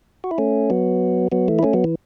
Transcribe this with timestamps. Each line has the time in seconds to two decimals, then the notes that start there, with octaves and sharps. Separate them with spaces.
0.24 F#4
0.31 E4
0.38 A3 C#4
0.70 F#3 B3
1.32 F#3 B3
1.48 E3 A3
1.59 E4
1.63 A3 C#4
1.73 F#3 B3
1.84 E3